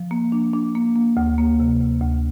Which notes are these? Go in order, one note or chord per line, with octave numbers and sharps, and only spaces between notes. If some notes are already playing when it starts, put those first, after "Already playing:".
Already playing: F3
A#3
D4
D4
A#3
A#3
D2
A#3
C3
D2
D2